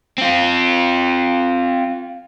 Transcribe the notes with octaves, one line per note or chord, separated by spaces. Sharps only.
C4 F4